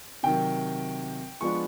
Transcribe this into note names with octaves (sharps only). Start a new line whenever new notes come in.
C3 D#3 F#3 G5
F3 G#3 B3 D4 F4 C#6